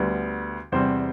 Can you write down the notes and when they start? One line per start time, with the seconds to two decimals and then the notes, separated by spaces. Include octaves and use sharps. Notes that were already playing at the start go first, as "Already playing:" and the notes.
Already playing: D2 D3 G3 B3
0.72 E2 C3 G3 C4 C5